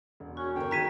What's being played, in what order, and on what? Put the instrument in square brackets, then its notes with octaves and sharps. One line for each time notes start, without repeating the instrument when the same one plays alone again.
[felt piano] E1
[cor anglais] C#4 [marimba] F#4
[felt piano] G1 A#4 [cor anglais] G5
[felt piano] D#3 [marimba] F#4 G#4 [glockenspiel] A#5 B6 D#7